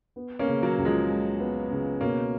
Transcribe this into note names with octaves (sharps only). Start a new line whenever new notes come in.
B3
A#3 C#4
C#3
F#3 A#3
C#2
F3 G#3
G#3
B3
C#3
B2 A#3 C#4